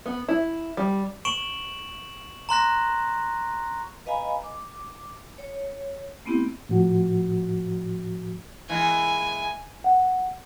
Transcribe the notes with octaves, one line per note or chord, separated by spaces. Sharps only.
B3
E4
G3
C#6 D7 E7 F#7
A#5 C6 F#6 A#6
B4 D#5 F5 G#5 A#5 B5
D6
C#5
A3 B3 C4 E4 G4
A2 F3 F#4
E3 G#3 A#3 G#5
F#5